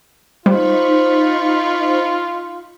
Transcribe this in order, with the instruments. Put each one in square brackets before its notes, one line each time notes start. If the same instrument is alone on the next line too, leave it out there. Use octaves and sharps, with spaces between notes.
[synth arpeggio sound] G3 [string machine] D#4 B5 C#6 [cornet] F4 [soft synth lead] C5